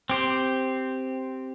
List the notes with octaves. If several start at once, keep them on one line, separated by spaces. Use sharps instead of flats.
C4 G4 C5